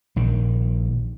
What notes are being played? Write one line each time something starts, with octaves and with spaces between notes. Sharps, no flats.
A#1 D#3